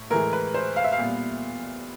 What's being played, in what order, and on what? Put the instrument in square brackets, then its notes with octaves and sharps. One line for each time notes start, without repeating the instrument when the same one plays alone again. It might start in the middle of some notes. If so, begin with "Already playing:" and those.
Already playing: [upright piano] A2
A2 E3 G#3 A#4
B4
C5
F5
E5
F5
A#2 G3 B3